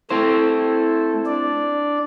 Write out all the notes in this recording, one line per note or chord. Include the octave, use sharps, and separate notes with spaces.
A3 C4 E4 A4 C5
D4 D5